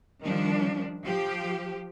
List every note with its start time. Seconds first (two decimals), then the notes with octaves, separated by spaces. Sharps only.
0.22 D#3 F3 G3 D4
1.05 F3 G4